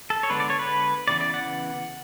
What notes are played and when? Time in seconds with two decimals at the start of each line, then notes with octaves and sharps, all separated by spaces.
0.10 A4
0.23 C#5
0.30 D3 G#3 B3 D4 B4
0.40 D5
0.50 C#5
0.59 B4
1.08 C#3 E3 B3 D5
1.21 D5
1.34 F#5